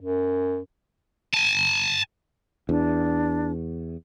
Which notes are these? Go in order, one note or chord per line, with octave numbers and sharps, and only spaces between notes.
F#2
G#5 A5
E2 D4